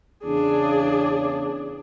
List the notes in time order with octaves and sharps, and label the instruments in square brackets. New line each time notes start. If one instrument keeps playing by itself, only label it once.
[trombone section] E2 C#3 [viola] D4 G#4